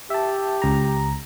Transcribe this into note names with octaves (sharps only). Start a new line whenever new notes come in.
G4 E5 A5
C#2 A#5